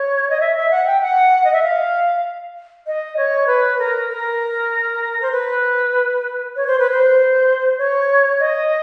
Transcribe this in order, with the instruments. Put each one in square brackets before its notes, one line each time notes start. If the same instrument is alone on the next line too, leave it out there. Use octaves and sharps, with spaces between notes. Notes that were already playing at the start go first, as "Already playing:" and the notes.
Already playing: [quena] C#5
D#5
E5
E5
F#5
G5
F#5
D#5
E5
F5
D#5
C#5
B4
A#4
A#4
C5
B4
C#5
C5
B4
C5
C#5
D#5